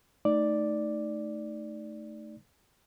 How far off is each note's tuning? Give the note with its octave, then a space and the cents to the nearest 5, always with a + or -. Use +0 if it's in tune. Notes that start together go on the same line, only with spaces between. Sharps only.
A3 +0 D#4 +0 D5 +0